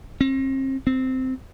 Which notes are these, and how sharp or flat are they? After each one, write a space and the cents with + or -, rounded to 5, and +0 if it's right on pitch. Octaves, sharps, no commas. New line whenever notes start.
C4 +40
C4 -10